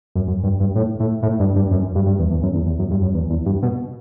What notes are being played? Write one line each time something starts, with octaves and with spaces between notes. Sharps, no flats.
F#2
F#2
G2
G2
A2
A2
A2
G2
G2
F#2
G2
G2
E2
E2
F#2
E2
E2
F#2
G2
F#2
E2
E2
G2
B2